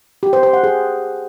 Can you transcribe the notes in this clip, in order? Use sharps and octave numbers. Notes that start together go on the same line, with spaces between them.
G4
C5
C5
F#5
G#4